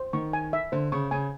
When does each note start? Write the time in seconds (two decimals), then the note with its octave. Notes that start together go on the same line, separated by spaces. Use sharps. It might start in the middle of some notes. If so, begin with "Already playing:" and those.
Already playing: C5
0.13 D#3 C#6
0.33 G#5
0.53 E5
0.72 D3 C5
0.92 C#3 C#6
1.11 C#3 G#5